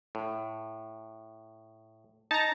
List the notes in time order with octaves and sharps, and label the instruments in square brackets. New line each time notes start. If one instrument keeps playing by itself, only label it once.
[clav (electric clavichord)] A2
[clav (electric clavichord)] D#4 [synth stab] A5 A#5